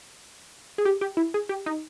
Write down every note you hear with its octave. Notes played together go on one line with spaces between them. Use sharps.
G#4
G4
G4
E4
G#4
G4
D#4